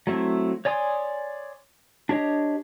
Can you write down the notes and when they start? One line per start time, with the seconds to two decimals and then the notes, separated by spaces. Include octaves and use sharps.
0.07 F#3 A3 C4 E4
0.65 C#5 D5 G#5 C6 D#6
2.09 D4 G4 C#5 D#5